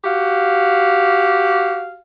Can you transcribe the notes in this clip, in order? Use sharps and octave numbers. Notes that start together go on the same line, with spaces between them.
F#4 G4 F5